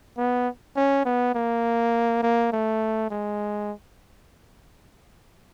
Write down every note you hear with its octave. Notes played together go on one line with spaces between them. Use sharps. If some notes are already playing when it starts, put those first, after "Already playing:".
B3
C#4
B3
A#3
A#3
A3
G#3